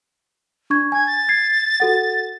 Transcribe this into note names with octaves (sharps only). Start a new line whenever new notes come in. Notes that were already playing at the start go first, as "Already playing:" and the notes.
D4 C#6 G#6
G#5 G#6
A6
G#6 C7
F#4 A4 F#5